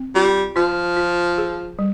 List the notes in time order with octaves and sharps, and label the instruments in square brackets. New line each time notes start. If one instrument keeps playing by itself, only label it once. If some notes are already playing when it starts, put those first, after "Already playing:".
Already playing: [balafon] C4
[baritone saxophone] G3 [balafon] F4
[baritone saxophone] F3 [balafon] F4
[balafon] F4
G#4
G3